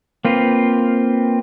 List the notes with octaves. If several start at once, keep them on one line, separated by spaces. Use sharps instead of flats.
A#3 C4 F4 B4